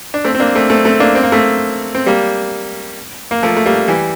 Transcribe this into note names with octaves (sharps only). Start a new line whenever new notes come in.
D4
A3 C4
C4
A#3 D4
A3 C4
A3 C4
A3 C4
A#3 D4
C4
A#3
A3 C4
C4
G3 A#3
A#3
F3 A3
A3
G3 A#3
E3 G3